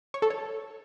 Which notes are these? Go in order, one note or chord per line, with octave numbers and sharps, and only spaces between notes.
C#5
A4
C#5